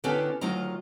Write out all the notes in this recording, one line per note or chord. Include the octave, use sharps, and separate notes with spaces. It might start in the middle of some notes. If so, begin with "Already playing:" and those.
D3 B3 C#4 D4 G4 A4
D2 D#3 F#3 F4 D#5 A#5